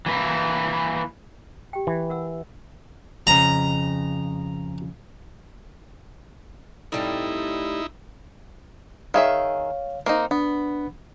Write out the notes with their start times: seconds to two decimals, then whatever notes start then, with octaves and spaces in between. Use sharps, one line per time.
0.06 E3 A#3 E4
1.73 G4 G5
1.87 E3
2.10 A#4 F#5 E6
3.27 F2 C#3 A#5
6.92 A2 G3 C4 D#4 E4
9.14 D#3 G#4 C#5 E5 F5
10.06 A#3 C4 D#4
10.31 B3 D4